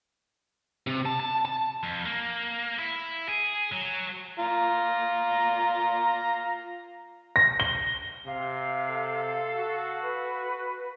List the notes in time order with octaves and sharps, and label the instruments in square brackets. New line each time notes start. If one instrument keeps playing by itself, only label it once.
[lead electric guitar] C3
A5
A5
A5
[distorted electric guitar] F2
A#3
E4
G#4
F#3
[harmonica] F4 A#5
[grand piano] A#6
G7
[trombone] C3 [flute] F5
[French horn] A4
[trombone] F#4
[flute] B4